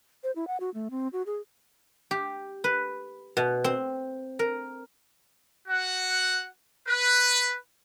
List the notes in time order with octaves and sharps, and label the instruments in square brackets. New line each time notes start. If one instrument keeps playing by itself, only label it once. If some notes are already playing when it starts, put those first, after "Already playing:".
[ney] C5
E4
F#5
F#4
A3
C4
F#4
G#4
[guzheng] G4
B4
B2
C4
A#4
[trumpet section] F#4 F#5
B4